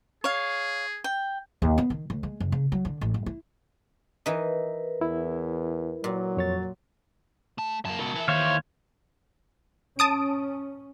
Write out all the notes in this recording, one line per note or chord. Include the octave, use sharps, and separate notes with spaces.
G#4 C#5 F5
G5
D#2
B3
D#3
D2
G#3
F#1
C#3
F#3
D3
A1
G2
E4
E3 D#4 A#4 B4
E2 E4
A#2 F#3
F2 C#5 A6
A3 A5
F#2 A#3 A5
C#2 B2 A#4 A5
E3 E5
D#2 C5 C#5 F5
C#4 A5 D#6 D7